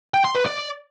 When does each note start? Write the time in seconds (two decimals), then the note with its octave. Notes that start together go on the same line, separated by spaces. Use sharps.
0.14 G5
0.25 C6
0.36 B4
0.46 D5